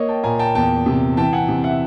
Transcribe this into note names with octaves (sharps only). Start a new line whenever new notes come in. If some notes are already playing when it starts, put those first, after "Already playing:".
Already playing: A#3 C#5 D#5
G5 A5
A#2 G#5 A#5
G5 A5
E2 G5 A5
C3
E3 G5 A5
F#5 G#5
C3
E5 F#5